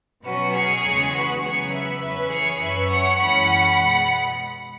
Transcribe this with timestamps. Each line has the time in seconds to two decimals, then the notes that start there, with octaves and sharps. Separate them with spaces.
0.24 B2 F#3 C#4 F#4 B4
0.53 G#4 C#5
0.83 E2 C#3 G#3 B3
1.13 F#4 B4
1.43 C#3 F#3 B3 G#4 C#5
1.73 B4 E5
2.01 E2 E3 C#4 B4 E5
2.31 G#4 C#5
2.60 F#2 F#3 C#4 B4 E5
2.90 C#5 F#5
3.19 F#2 E3 G#3 C#4 F#5 B5
3.79 B2 G#3